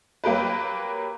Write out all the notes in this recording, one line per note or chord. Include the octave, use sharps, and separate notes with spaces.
F#3 A#3 G4 A#4 B4